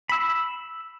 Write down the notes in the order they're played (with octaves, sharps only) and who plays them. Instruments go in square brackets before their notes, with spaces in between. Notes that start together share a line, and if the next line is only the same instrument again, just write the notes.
[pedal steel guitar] B5 E6